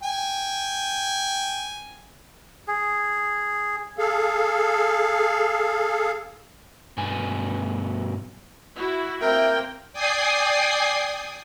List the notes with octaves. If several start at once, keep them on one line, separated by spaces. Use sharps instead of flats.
G5 G#5
G#4
G#4 A4 F5
G2 B2 B3 G#5
E4 F#4
A#3 C4 A#4 E5 G5
D5 G5 G#5 D#6 C7